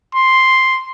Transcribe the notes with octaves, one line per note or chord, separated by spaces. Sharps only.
C6